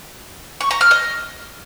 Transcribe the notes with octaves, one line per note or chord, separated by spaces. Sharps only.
C#6
A#5
F6
D#5